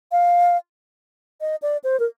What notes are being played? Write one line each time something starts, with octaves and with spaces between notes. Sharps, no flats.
F5
D#5
D5
C5
A#4